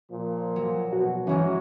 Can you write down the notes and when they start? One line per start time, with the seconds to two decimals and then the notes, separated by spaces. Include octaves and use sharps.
0.10 A#2 F3
0.56 F#3
0.93 B2 F#4
1.27 E3 F#3 G#3 C#4